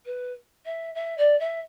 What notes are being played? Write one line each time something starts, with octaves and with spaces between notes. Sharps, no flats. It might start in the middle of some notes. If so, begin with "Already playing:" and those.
B4
E5
E5
D5
E5